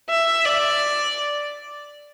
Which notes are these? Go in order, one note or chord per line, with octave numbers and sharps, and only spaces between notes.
E5
D5